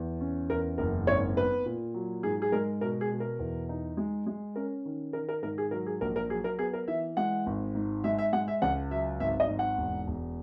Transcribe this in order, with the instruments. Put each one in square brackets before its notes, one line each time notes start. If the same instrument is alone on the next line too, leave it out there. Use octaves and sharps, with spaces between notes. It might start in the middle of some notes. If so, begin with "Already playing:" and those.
Already playing: [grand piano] E2
C#4
E2 A#4
F#1 A#4
G#1 C#5
B3 B4
A#2
F#3
G#2 G#4
G#4
G#3 A#4
B2 A#4
G#4
B2
A#4
E2
D#4
G#3
G#3
C#4 A#4
D#3
D#3 A#4
A#4
G#2 A#4
G#4
F#3 A#4
G#4
A#1 A#4
A#4
F#3 G#4
A#4
B3 G#4
A#4
E3 E5
G#3 F#5
G#1
G#2
G#3 E5
E5
G#3 F#5
E5
C#2 F#5
F#3 E5
G#1 E5
D#5
G#2
F#5
E1
E1